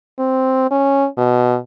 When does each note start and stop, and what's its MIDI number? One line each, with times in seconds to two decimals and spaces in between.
0.19 0.66 60
0.71 1.07 61
1.18 1.58 47